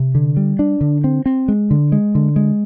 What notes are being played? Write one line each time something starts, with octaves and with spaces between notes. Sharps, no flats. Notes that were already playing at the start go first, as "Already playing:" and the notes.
Already playing: C3
D3
G3
D4
D3
C4
C4
G#3
D3
G#3
D3
G#3